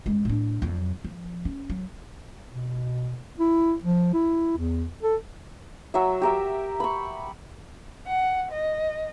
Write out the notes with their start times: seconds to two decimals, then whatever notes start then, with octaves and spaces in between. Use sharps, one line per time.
0.06 F#2 G#3
0.25 A2 D4
0.62 F2 F#3
1.04 F3
1.45 C#4
1.70 F#3
2.54 B2
3.40 E4
3.84 F3
4.14 E4
4.57 E2
5.02 A4
5.94 F#3 E5
6.22 G4 A#4 E5
6.80 B5 C#6
8.07 F#5
8.52 D#5